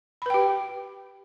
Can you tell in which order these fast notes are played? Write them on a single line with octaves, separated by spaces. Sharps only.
B5 B4 G5 G4